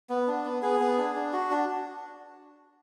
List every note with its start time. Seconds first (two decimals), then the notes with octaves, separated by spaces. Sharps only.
0.09 B3
0.27 D4
0.45 B3
0.62 B3 G#4
0.80 B3
0.98 D4
1.15 D4
1.33 F#4
1.51 D4